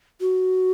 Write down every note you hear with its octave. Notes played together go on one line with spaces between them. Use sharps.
F#4